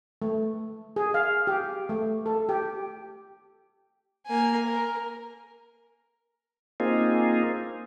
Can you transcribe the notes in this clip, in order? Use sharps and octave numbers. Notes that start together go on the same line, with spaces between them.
A3
G#4
F5
G4
A3
A4
G4
A#3 G#5
A#4
A#3 C4 D#4 F4 G#4